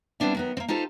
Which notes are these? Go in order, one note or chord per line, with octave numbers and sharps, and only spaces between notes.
G3 B3 C4 D4 E4
D#3 F#3 B3
A#3 C4
D#4 F4 G4 A4 C5